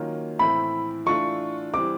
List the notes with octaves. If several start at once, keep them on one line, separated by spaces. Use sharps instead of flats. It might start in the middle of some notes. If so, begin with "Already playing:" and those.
Already playing: D#3 F#3 A#3 C#4 F4
A2 E3 A3 C4 E4 B5
E3 A3 D4 F4 C#6
E3 G3 C4 D6